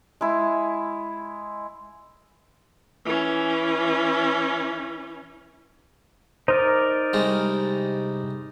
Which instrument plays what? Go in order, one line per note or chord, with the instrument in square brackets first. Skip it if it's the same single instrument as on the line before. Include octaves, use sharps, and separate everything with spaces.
[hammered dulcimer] G#3 E4
[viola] E3 C#4
[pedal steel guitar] D#4 A#4 D5 [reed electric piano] C5
[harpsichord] C2 C3 G#3